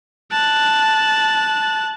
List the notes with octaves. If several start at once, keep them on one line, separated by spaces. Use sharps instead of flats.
A5 F#6